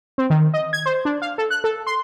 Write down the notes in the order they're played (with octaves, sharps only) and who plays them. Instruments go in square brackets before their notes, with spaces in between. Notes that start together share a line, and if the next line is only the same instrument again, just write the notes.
[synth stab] C4
D#3
D#5
G#6
C5
D4
F5
A4
F#6
A4
C6